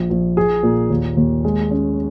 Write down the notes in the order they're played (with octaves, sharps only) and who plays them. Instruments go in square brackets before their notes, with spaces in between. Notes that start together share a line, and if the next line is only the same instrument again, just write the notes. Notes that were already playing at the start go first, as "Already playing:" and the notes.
Already playing: [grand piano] A#1
A#1
G#4
A#2
D#2
D#2
G#3
C#4